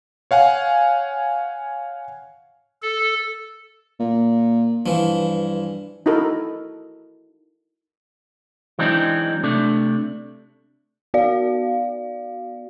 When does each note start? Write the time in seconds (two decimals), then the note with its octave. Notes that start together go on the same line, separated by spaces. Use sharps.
0.31 C#5 F5 F#5 G#5
2.82 A4
4.00 A#2
4.86 G2 E3 F3
6.06 D#4 E4 F#4 A4 A#4
8.79 E3 F#3 G#3 C4 D4 D#4
9.44 C3 A3 D4
11.14 B3 F#4 D5 F5